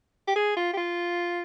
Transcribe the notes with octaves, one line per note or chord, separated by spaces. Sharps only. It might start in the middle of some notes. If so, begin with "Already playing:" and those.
G4
G#4
F4
G4
F4